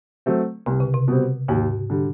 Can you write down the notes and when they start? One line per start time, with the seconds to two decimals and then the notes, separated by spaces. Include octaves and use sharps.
0.26 F#3 A3 C4
0.66 C2 C3
0.80 C#3
0.94 C3
1.08 B2 G3 C4
1.48 D#2 G#2
1.90 D3 G3